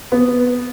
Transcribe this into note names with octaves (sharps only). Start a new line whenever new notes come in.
B3